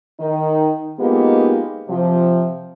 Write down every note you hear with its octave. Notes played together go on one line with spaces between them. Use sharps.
D#3 D#4
G#3 A#3 B3 D#4 F4 G4
C3 F3